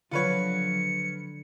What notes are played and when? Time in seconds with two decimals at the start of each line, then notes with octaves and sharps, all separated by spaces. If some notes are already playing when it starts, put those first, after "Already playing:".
0.11 D3 F3 F#3 F4 B4 C#5 C#7